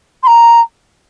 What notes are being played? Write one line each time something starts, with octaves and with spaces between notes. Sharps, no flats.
C6
A#5